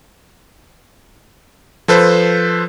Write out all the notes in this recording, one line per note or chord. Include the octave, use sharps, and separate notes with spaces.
F3 A4 B4 C5